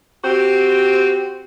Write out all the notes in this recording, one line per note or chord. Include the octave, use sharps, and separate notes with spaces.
C4 F#4 G4 C5